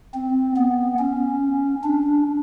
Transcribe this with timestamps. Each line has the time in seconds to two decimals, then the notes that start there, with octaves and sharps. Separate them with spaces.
0.14 C4
0.57 B3
0.99 C#4
1.84 D4